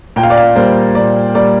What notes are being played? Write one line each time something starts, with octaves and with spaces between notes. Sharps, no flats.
A#2 G5
F5
D5
F5
G3 A#3 C5
A#2 D5
G3 A#3 D5